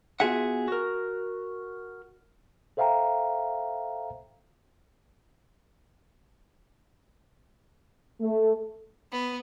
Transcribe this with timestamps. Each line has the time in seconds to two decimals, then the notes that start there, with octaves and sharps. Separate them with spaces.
0.20 B3 F4 F#4 G#4 E5 F#5
0.68 F#4 A#4
2.77 A4 C5 E5 F5 G5 A#5
8.21 A3
9.12 B3